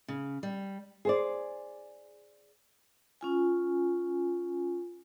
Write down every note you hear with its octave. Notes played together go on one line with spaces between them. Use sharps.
C#3
G3
G#4 C5 D5
C#4 F4 G#5